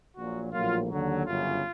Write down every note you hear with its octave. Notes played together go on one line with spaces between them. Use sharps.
A#1 A#2 F#3 F#4
A#1 A2 F#3 A#3 F4
D#2 D3 F#3
G1 F#2 C#3 F4